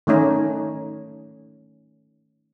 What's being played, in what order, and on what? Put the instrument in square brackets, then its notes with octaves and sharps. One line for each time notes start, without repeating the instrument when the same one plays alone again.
[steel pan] D#3 A3 C#4 D#4